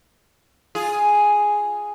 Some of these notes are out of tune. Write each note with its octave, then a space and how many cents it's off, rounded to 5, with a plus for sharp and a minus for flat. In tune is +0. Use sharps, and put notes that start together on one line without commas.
F4 +0 G#4 +0